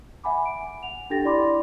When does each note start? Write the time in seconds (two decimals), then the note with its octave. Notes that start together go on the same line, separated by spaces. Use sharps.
0.24 E5 F#5 G#5 B5 D6
0.45 D7
0.83 F#5 F7
1.10 D4 G4 A4 G5 A6 A#6
1.25 E4 D5 B5 C6 D6